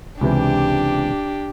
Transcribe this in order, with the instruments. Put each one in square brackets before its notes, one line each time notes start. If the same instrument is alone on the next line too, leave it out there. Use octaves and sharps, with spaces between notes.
[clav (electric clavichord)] C#2 C3 E3 [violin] D4 G4